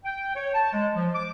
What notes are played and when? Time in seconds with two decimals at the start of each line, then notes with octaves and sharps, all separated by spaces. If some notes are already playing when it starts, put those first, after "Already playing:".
0.05 G5
0.36 C#5
0.55 A5
0.73 G#3
0.96 F3
1.14 D6